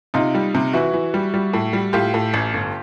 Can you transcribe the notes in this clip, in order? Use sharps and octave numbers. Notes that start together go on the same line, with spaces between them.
C3 D#4 F4
G3
C3
E3 E4 F#4
E3
G3
G3
A2
G3
A2 F4 G4
A2
A1
G1